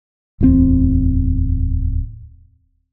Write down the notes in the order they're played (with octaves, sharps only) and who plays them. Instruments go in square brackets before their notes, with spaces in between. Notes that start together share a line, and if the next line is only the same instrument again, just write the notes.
[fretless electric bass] D1 E2 D#3 C4